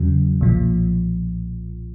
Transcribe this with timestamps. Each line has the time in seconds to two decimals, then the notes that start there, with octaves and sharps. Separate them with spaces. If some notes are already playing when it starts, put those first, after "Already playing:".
Already playing: E2 C#3 F#3
0.41 B1 A#2 F3